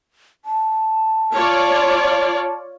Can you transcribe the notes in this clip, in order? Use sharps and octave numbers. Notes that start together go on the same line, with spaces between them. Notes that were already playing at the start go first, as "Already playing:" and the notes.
A5
F4 C#5 D5